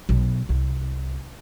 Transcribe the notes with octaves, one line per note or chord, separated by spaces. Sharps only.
B1
C2